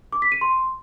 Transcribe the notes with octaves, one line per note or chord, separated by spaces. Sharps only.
D6
B6
D#7
C6